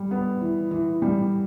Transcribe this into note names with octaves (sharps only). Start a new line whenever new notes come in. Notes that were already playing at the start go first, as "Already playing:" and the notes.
Already playing: G3
B3
E3
E3
G3